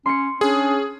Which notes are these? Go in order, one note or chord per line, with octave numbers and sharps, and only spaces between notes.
C#4 C6 C#7
C#4 D4 G#4